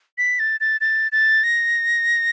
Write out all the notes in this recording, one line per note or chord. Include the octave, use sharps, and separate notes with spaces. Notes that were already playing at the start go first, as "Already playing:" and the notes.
B6
A6
A6
A6
A6
A#6